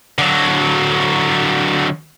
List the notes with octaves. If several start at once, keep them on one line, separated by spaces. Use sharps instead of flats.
D3 F#3